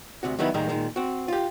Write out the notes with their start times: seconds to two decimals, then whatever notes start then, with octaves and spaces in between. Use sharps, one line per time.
0.23 D2 C3 F#4
0.39 D#3 F#3 G3 B3 E4
0.54 A2 D#3 G3 G#3 A#3 A#4
0.69 A#2 D#3 G#3
0.96 C4 F#4
1.28 F4 G4